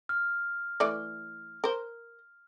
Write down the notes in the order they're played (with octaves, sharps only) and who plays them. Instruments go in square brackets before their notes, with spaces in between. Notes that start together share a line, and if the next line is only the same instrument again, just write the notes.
[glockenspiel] F6
[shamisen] E3 A3 D5
A#4 C5